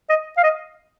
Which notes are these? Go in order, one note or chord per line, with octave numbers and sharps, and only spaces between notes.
D#5
F5
D#5